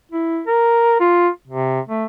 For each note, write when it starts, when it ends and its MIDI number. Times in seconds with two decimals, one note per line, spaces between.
0.11 0.41 64
0.47 0.99 70
1.00 1.29 65
1.47 1.80 48
1.89 2.05 57